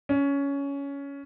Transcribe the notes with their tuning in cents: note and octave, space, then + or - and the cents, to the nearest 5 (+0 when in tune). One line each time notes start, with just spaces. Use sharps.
C#4 +15